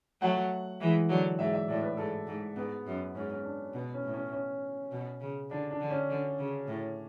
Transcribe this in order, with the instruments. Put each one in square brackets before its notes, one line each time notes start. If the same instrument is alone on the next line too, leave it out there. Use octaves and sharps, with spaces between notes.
[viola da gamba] F#3 A3 [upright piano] F#5
[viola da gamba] E3 G#3
D3 F#3
[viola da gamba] G#2 [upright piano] E5
[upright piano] D5
E5
[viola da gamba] A2 [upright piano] D5
[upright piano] B4
[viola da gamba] G#2 [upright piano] A4
[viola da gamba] G#2
[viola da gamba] G#2 [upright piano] B3
[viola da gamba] F#2
[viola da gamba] G#2 [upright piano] C#4
[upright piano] C#4
D4
[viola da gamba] B2 [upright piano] B3
[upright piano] C#4
[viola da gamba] A2
[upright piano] C#4
C#4
[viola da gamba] B2
C#3
[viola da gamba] D3 [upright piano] D4
[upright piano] D4
[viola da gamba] D3
[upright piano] C#4
[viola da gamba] D3
C#3
A2